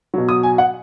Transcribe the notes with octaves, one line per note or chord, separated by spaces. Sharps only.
B2 F#3
D#6
G#5
F#5